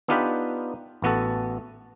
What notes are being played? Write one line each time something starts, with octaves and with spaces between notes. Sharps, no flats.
B3 D4 D#4 F4 G4 B4
A1 B3 F#4 A4